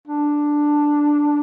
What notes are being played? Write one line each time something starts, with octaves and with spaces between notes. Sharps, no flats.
D4